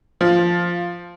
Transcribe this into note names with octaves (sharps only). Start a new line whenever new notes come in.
F3